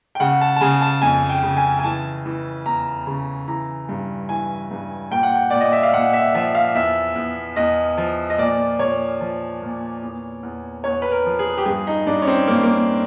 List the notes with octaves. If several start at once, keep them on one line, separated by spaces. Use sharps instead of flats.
G5
C#3 F#5
A5
A5
C#3 G#5
A5
F2 G#5
G5
C#3
G#5
G#5
E3 A5
E3
E2 A#5
C#3
E3 A#5
G2
E3 G#5
G2
A#2 G5
F#5
G5
A#2 D5
D#5
E5
F5
A#2 F#5
E5
F3 E5
F5
E2 E5
E2
E2 D#5
F3
D#5
A#2 D5
A#2 C#5
F3
A#2
E2
E2
E2 C#5
B4
A#4
F3
G#4
G4
G2 G#4
D#4
G2 D4
C#4
C4
G2 A#3
A#3